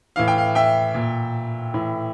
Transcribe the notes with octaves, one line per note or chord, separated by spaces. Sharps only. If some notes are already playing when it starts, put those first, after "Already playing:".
A2 E3 F5
G5
F5
E5 G5
A#2
A2 E3